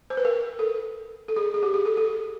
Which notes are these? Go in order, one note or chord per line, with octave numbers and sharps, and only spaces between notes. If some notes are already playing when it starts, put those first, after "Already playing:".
C5
B4
A#4
A4
A4
G#4
G#4
G4
G#4
A4
A4